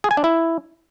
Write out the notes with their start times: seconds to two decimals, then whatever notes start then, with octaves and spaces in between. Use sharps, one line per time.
0.04 G#4
0.11 G#5
0.17 D4
0.24 E4